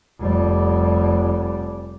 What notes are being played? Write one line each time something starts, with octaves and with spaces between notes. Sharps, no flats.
F1 G3